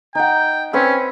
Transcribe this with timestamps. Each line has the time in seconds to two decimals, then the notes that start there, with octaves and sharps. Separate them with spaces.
0.15 D#4 F#5 G5
0.73 C4 C#4 B4 E6